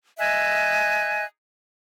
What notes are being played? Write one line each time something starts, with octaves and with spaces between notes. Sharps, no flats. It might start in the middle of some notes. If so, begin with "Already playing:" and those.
D#5 E5 G#5 F#6